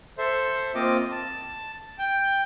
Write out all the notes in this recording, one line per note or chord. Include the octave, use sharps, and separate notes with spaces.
A4 C5 E5
A#3 C4 F4 D#5 D6
A5
G5